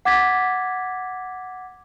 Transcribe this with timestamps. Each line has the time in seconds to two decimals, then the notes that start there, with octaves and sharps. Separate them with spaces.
0.05 F#5 D6 G#6 A6 B6